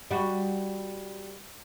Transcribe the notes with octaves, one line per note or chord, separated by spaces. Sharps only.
G3 F#4